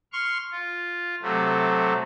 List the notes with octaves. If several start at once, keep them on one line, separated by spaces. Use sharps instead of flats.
C6 C#6 F6
F4
C3 F#3 A3